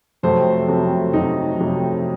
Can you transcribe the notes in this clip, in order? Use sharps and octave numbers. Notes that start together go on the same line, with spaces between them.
F2 C3 F#3 A3 C5
F2 C3 F#3 A3
F2 C3 F#3 A3 D#4
F2 C3 F#3 A3